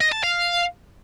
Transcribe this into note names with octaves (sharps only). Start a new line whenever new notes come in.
D#5
A5
F5